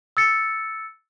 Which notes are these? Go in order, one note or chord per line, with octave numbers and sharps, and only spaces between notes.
E6 A6 C#7